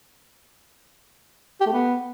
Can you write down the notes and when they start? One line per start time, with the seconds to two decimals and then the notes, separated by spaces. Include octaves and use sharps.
1.61 G4
1.66 A3
1.72 B3